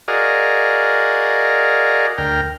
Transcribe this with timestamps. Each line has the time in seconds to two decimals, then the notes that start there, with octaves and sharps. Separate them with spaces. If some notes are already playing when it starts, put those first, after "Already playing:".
0.08 F#4 G#4 A#4 D5 D#5 F5
2.18 D2 A#4 G5 F6